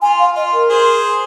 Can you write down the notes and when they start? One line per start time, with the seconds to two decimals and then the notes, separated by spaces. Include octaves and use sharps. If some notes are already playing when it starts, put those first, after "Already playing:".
0.02 F4 G#5
0.19 F5
0.35 F4 D#5
0.53 A#4
0.69 G#4 C5